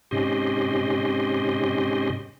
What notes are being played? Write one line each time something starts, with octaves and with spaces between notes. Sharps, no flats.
G#2 C3 C#4 G4 D#5 C6